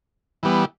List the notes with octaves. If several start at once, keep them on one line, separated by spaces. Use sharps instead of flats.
E3 G3 B3